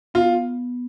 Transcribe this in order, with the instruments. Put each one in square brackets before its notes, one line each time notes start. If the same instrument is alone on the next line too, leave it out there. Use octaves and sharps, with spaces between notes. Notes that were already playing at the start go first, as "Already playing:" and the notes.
[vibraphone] B3 [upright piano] F4